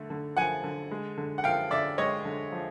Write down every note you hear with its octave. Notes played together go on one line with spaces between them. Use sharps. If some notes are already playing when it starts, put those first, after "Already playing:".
Already playing: D3 A3
D3
F3 F#5 G#5
D3
G#3
D3
F#5
F3 F5 G5
D3 D5 E5
G#3 C#5 D#5
D3
F3